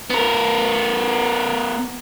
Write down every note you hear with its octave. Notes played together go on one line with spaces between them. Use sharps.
B3 A#4